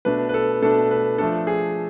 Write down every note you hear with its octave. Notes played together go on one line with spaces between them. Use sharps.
B2 A3 D4 B4
B4
A4
B2 A3 D4 A4
B4
F3 A3 D4 A4
G#4